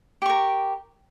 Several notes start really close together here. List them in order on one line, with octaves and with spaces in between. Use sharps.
G4 C#6 A#4